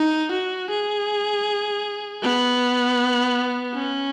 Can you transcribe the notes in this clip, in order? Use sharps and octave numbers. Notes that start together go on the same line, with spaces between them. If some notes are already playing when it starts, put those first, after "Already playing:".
Already playing: D#4
F#4
G#4
B3
C#4